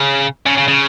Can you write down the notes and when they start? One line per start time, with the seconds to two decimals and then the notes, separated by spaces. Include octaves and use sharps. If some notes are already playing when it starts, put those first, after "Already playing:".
Already playing: C#3
0.46 C#3
0.58 C#3
0.68 C#3